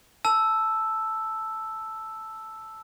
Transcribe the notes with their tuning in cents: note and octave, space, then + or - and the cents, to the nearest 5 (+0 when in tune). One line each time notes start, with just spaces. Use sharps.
A5 +0 E6 +0